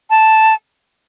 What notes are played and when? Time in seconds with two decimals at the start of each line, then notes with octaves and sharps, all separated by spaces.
0.10 A5